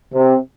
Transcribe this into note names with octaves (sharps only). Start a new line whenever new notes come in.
C3